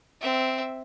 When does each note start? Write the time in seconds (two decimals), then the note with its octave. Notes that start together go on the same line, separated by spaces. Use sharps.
0.21 C4 E5